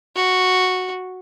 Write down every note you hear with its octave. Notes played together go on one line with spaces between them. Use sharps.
F#4